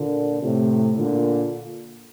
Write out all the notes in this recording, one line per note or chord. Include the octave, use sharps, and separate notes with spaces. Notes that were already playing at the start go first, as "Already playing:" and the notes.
Already playing: A#2 D3
A2 C3
A#2 D3